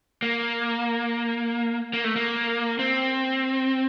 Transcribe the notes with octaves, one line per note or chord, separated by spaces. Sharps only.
A#3
A#3
A3
A#3
C4